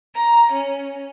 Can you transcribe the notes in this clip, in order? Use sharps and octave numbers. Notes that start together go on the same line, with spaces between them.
A#5
C#4